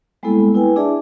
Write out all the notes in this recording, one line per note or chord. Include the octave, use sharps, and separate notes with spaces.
G3 G#3 A#3 B3 E4 A4
E4 B4 G5 G#5
D4 G#4 D5 E5 A5